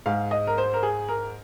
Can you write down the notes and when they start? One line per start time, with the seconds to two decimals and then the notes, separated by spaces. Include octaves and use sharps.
0.06 G#2 G#3 F5
0.31 D#5
0.47 A#4
0.58 C5
0.74 A#4
0.83 G#4
1.09 A#4